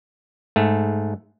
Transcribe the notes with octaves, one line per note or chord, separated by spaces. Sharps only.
G#2 A3